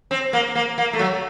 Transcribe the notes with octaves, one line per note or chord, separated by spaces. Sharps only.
C4
A#3
A#3
A#3
A3
F#3